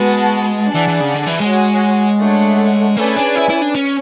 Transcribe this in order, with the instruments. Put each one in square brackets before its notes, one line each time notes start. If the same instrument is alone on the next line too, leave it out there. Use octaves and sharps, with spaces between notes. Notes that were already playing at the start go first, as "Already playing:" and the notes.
Already playing: [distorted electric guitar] G#3 [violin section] B3 F#4 B4 F#5 A5
[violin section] D4 G#4 D5 F#5 A5
[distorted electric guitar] E3
E3
C#3
D3
E3
[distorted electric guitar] G#3 [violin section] F#4 C#5 G#5
[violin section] A3 D4 A4 C#5 F#5
[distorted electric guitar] A3 [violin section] C#4 G#4 B4 D5 G#5
[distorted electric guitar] D4
E4
E4
D4
C#4